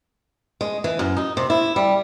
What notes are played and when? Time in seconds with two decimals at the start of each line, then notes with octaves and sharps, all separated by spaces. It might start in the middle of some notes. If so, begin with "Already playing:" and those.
0.61 G#3
0.84 E3
0.99 F#2
1.17 D#4
1.37 C3
1.50 E4
1.76 G3